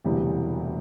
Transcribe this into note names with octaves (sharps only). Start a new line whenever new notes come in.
E1 D2 C3 E3 G3